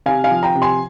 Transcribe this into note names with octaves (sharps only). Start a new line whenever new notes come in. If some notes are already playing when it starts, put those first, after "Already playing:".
C3 F5 G#5
F5 G#5
F3
G5 A#5
C3
G#5 C6